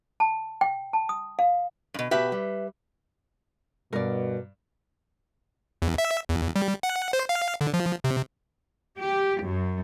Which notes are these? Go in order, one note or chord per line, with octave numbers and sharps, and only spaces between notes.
A5
G5
A5
D#6
F5
G2 B2
B2 F#4 G4 B4 E5
G3
G2 B2 A#4 D5
E2
E5
E2
G3
F#5
C5
F5
D3
F3
C3
G4
F#2